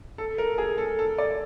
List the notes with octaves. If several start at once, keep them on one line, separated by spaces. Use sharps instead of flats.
A4
A#4
G#4
A4
A4
D5